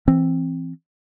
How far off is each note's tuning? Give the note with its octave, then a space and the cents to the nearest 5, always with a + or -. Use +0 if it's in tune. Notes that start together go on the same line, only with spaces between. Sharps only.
E3 +10 C4 +10